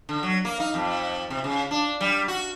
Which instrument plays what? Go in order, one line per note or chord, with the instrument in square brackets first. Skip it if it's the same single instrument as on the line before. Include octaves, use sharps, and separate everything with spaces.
[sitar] D3
F#3
A#3
D#4
F2
C3
C#3
D4
G3
F#4